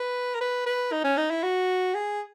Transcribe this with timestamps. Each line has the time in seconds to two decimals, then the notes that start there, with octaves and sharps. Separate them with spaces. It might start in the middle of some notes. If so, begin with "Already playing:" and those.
Already playing: B4
0.35 A#4
0.40 B4
0.66 B4
0.92 D#4
1.04 C#4
1.17 D#4
1.30 E4
1.43 F#4
1.94 G#4